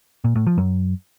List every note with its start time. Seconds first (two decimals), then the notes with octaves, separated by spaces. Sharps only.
0.24 A#2
0.35 A2
0.47 F3
0.58 F#2